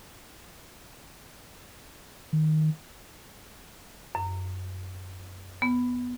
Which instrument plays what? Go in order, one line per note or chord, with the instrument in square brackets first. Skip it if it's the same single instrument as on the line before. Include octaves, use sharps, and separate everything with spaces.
[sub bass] D#3
[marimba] F#2
B3